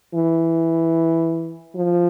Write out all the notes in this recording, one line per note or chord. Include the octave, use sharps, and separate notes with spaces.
E3
F3